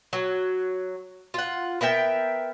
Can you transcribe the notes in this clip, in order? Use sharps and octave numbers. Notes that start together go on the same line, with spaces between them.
F#3
F4 F#5
B3 A#4 E5 G5